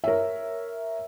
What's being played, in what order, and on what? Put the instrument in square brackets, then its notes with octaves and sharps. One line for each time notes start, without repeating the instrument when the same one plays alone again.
[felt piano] A#4 C#5 E5